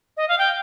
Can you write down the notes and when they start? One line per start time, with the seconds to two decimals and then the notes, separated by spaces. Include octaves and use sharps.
0.17 D#5
0.28 F5
0.38 G5